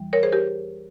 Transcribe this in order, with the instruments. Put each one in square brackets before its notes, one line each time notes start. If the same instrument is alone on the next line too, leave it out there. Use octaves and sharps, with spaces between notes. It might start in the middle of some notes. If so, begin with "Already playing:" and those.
Already playing: [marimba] E2 E3 G3
A#4 C#5
G#4 C5
G4 A#4